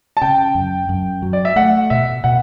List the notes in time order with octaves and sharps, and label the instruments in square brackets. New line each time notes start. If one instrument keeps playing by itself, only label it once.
[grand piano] A5
[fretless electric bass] C#3 [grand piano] G5
[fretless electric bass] F#2
F#2
F#3
[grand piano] D5
E5
[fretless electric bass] A3 [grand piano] F#5
[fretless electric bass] B2 [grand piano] E5
[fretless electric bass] B2 [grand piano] F#5